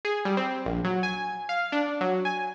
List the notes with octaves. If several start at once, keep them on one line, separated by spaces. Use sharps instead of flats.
G#4
G3
C4
A#1
F#3
G#5
F5
D4
F#3
G#5